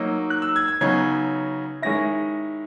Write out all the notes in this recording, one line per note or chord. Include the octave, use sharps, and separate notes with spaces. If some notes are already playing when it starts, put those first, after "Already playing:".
Already playing: F#3 A#3 D#4 E6
F#6
E6
G#6
G#6
C#3 F#3 B3 D#4 G#6
D#3 G#3 C#4 E4 A#6